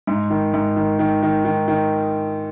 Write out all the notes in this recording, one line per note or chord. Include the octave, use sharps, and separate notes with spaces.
G#2
D#3
G#2
D#3
D#3
D#3
D#3
D#3